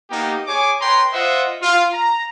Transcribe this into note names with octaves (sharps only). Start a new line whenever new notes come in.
A#3 B3 D#4 G4
G#4 C#5 G#5 D6
B4 C#5 G5 A#5 C6
F4 C5 D#5 E5 F#5
F4
A#5